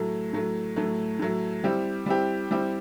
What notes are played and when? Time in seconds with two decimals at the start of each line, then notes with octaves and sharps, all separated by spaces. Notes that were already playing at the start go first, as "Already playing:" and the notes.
Already playing: A2 F#3 A3
0.33 A2 F#3 A3
0.76 A2 F#3 A3
1.19 A2 F#3 A3
1.64 G3 C4 E4 G4
2.06 G3 C4 E4 G4
2.51 G3 C4 E4 G4